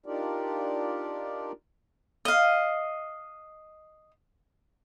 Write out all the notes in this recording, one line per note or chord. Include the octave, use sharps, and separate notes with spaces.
D4 D#4 F4 G4 A#4 D5
D#5 F5